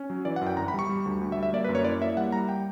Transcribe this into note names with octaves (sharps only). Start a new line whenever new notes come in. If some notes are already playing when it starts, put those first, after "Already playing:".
Already playing: C#4
F#3
E3 D5
F#5
F#2
G5
G1 A#5
B5
G3 C#6
G3
D2
D2
E5
G3
E5
A#3 D5
B4
F#2
C#5
E4 D5
A#3 E5
G3 F#5
G3 A#5
G5